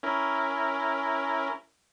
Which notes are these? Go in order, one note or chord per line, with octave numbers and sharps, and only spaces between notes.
C#4 E4 A#4